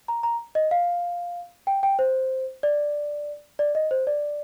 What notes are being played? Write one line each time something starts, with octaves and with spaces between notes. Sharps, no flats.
A#5
A#5
D#5
F5
G5
G5
C5
D5
D5
D#5
C5
D5